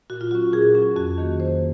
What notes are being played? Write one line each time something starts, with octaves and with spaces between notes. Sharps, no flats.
A#2 F#4
F4
F#3 C#4 F#4
A#2 G#4
F#3 C#4
F2 F#4
D#3 A#3
F2 C5